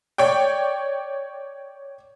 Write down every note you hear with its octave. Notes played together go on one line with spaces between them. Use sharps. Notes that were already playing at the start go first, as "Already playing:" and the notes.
C#5 D5 G5